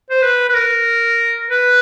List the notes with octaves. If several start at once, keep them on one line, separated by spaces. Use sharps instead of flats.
C5
B4
B4
A#4
B4